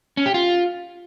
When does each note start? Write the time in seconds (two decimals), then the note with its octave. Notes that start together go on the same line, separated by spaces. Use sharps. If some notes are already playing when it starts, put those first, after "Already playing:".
0.17 C#4
0.26 G4
0.34 F4